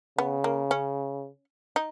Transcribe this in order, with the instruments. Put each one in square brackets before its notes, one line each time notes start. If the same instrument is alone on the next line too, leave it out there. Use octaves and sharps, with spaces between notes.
[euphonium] C#3 [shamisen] B3
[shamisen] A#3
C#4
D#4